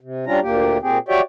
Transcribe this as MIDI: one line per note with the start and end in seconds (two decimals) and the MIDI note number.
0.01 0.25 48
0.26 0.40 55
0.26 0.40 61
0.26 0.40 62
0.26 0.40 65
0.26 0.40 82
0.42 0.78 38
0.42 0.78 46
0.42 0.78 58
0.42 0.78 67
0.82 0.98 46
0.82 0.98 60
0.82 0.98 67
0.82 0.98 68
1.08 1.21 66
1.08 1.21 67
1.08 1.21 73
1.08 1.21 74
1.08 1.21 76
1.08 1.21 79